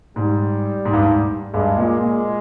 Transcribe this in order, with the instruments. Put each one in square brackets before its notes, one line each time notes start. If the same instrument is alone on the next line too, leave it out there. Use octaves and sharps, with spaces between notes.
[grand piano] G#2 [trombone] G3
[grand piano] G#2
G2
G#2
[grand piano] G2 [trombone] G#3
[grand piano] A#2
A#2